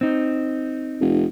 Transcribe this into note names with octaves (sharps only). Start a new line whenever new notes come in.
C4 D#4
F1